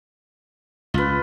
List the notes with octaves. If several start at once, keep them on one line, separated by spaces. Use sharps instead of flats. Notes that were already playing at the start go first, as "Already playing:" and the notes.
C#2 F4 B4